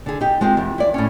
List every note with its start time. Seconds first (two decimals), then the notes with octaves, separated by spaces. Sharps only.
0.06 D3 G#4
0.21 D#4 G4
0.41 G#3 C4 F4 G4
0.57 E2
0.78 E4 D5
0.94 A2 C#4